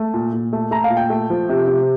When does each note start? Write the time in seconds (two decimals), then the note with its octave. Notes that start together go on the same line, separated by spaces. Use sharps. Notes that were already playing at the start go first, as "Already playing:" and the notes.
Already playing: A3
0.14 A#2
0.33 A#2
0.53 A3
0.71 A3 A#5
0.84 F5
0.90 A#2
0.97 G5
1.10 A3
1.30 F3
1.49 C3
1.68 C3